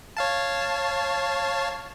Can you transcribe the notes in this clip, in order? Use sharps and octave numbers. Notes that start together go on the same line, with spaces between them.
C#5 F5 A5